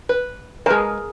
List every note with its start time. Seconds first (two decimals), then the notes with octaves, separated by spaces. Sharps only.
0.09 B4
0.66 G#3 G#4 A#4 B4 A5